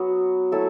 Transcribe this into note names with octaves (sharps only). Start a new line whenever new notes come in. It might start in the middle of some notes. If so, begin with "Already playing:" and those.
Already playing: F#3 B3 F#4
F#3 A3 E4 A4